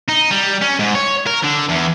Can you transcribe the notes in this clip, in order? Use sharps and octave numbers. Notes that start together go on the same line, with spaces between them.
D#4
G3
C#4
G#2
C#5
A#4
D3
E2